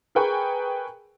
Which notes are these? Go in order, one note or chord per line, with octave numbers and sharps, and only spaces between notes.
G#4 A#4 B4 G5 G#5 C#6